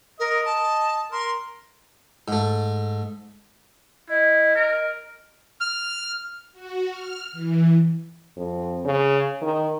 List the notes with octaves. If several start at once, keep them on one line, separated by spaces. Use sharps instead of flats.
A#4 D#5
A5
A#4 C6
G#2 A3
E4 D#5
A#4
F6
F#4
F6
E3
F2
C#3
D#3